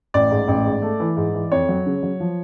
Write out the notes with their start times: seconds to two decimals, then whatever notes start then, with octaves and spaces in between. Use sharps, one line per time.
0.14 A1 D5
0.31 G#2
0.48 A1
0.66 G#2
0.82 A3
1.00 E3
1.17 G#2
1.34 E3
1.52 F2 C#5
1.69 F#3
1.86 C#3
2.03 F#3
2.20 F3